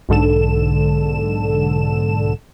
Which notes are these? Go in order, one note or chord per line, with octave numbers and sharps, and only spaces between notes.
B1 G#2 D3 A4 E7